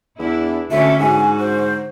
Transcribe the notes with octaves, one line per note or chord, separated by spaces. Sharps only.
E2 D4 E4
D2 D3 C#4 A4 E5
G#2 F#4 G#5
C5